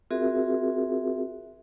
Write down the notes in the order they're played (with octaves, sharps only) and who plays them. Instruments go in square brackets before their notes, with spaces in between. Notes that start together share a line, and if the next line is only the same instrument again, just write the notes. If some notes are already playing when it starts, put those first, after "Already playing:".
[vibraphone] C4 F4 F#4 G#4 A#4 E5